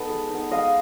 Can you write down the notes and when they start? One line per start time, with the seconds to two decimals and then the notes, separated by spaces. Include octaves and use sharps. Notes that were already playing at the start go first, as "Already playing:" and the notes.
Already playing: B3 D#4 A4 B4
0.09 G#3
0.30 B3 D#4
0.51 G#3 D#5 F5